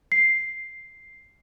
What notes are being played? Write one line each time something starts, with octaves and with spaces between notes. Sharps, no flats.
C7